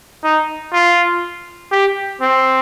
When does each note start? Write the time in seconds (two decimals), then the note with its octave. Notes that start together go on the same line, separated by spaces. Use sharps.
0.24 D#4
0.73 F4
1.72 G4
2.21 C4